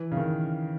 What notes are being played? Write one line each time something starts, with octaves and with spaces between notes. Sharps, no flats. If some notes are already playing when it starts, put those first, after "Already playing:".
Already playing: E3
C#3
D#3